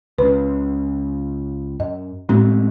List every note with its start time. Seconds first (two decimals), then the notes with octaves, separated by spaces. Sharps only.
0.18 C#2 C#3 B4
1.80 F#2 D#5
2.29 A2 G#3 A3 C4